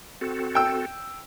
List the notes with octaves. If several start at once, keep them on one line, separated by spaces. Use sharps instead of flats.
C4 F#4 A4
G5 E6